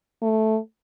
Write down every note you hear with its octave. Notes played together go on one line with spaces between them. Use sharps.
A3